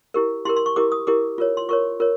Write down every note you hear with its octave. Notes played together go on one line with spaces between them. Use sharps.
E4 G4 A#4
E4 G4 A#4 C6
C6
C#6
E4 G4 A#4 D6
D#6
E4 G4 A#4 D6
F4 A#4 C#5
C6
F4 A#4 C#5 C#6
F4 A#4 C#5